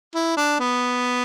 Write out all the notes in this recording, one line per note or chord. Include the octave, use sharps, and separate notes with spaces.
E4
D4
B3